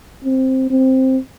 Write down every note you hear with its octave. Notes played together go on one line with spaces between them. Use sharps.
C4
C4